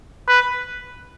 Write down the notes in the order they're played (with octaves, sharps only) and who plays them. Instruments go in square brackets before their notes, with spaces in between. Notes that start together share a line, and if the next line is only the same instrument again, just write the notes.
[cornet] B4